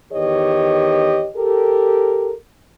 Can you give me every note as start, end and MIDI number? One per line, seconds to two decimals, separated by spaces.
0.12 1.26 40
0.12 1.26 51
0.12 1.26 67
0.12 1.26 71
0.12 1.26 73
0.12 1.26 75
1.36 2.32 67
1.36 2.32 69
1.36 2.32 70